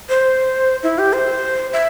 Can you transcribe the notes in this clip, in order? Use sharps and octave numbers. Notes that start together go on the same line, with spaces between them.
C5
E4
G4
C5
E5